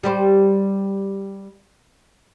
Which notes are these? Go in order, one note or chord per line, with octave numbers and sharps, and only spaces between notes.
G3 G4 C5